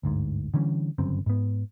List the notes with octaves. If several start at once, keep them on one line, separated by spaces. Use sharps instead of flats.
G1 D2 G#2
D3 E3 G3 C#4
G1 F#2 C#3 C4
G#2 B3